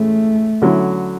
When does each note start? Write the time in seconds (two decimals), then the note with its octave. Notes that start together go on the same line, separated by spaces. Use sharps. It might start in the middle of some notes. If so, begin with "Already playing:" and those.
Already playing: A2 E3 G#3 A3 C#4
0.62 D3 F#3 C#4 E4